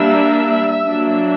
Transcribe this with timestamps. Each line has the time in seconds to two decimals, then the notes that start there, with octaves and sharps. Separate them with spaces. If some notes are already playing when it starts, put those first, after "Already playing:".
Already playing: G3 A#3 D4 E5
0.86 F#3 A#3 D4